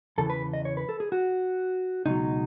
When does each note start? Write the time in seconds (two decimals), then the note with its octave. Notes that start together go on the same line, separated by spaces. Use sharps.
0.18 E2 C#3 E3 A4
0.30 B4
0.53 D#5
0.65 C#5
0.77 B4
0.89 A4
1.00 G#4
1.12 F#4
2.06 C#2 B2 F#3 D#4